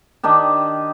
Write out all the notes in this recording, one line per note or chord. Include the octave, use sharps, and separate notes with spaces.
D#3 D4 G4 D#5